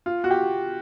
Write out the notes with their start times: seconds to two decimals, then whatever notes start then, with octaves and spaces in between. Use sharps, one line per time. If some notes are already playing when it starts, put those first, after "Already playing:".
0.06 F4
0.24 F#4
0.31 G4